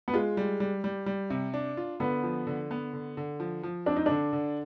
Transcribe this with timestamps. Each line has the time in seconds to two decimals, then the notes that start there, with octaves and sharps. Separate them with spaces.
0.08 B3
0.14 G#3 F4
0.37 G3
0.60 G3
0.84 G3
1.06 G3
1.30 C3
1.54 D4
1.77 F4
2.00 D3 B3
2.23 F3
2.47 D3
2.71 B3
2.93 D3
3.17 D3
3.40 F3
3.63 F3
3.86 C4 D4
3.96 D#4
4.06 D3 D4
4.33 D3